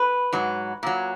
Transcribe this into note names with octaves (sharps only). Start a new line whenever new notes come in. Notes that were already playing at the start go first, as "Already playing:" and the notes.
Already playing: B4
G#2 F#3
A#2 F#3